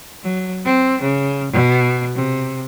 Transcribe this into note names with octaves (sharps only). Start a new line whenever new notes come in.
F#3
C4
C#3
B2
C3